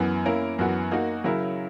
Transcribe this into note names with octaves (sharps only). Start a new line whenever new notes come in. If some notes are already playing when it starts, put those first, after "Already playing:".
Already playing: F#2 E3 B3
A#3 C#4 E4 A#4
F#2 E3 B3 F#4
A#3 D#4 F#4
C#3 F#3 C#4 E4 A#4